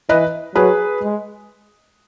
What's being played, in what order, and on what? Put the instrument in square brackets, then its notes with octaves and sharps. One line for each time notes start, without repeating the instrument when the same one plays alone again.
[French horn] E3 [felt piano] B4 D#5
[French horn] F#3 [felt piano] G#4 B4
[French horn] G#3